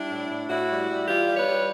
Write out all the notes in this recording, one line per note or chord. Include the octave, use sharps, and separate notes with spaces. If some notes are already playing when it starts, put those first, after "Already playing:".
Already playing: G3 D4 E4
A2
A2
A2 E4 F#4
G3
G3
E3 F4 G4
G3
B4 C#5
G3